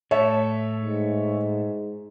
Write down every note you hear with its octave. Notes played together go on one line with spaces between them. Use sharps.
A2 A3 C#5 E5 A5
G#2